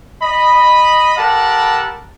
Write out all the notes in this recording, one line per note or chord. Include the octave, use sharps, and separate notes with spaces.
D#5 B5
G4 A4 A#4 F#5 A5 B5